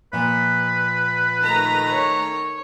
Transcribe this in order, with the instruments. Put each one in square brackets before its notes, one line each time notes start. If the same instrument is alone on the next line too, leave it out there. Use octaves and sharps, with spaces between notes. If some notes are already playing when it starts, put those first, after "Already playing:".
[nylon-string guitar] A#2 F3 [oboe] B4
[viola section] D#3 A3 A#5
[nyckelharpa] C#5